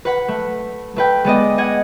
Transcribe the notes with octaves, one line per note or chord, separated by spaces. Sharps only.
B4 F#5 B5
A3
A3 B4 G5
G#3 B3 D5 D#5
D#5 F#5 G#6